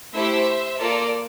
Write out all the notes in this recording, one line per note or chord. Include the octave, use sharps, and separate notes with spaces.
A3 E4 G4 C5 E5
A#3 F4 A4 A#4 D5